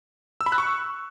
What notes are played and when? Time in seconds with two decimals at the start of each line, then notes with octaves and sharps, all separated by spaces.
0.41 E6
0.46 B5
0.52 F#6
0.58 C#6